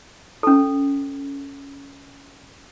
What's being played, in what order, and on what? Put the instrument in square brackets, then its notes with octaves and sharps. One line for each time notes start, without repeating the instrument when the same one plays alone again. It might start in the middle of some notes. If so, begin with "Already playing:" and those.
[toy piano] C#4 A4